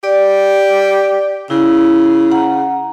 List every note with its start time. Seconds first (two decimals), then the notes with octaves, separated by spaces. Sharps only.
0.04 G4 D5
1.50 C#3 E4
2.32 F#5 A#5